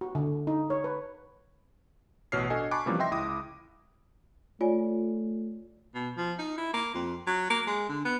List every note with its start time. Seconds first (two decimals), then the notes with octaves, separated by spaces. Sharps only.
0.01 F#4
0.15 D3
0.47 D#4
0.70 C#5
0.84 B4
2.32 A1 B2 C#5 F6 C7
2.50 D4 F#4 A4 D#5 G#5
2.71 G#5 A5 B5 C#6 D6 F#6
2.86 C3 E3 F3 G3 A#3 C#4
2.99 D#5 E5 G5 C6 A#6
3.11 C#2 E4 D6 D#6
4.61 A3 F4 C#5 D5 G#5
5.94 B2
6.17 F3
6.39 D#4
6.58 E4
6.73 A#3
6.94 F2
7.27 F#3
7.50 A#3
7.67 G#3
7.89 D3
8.05 B3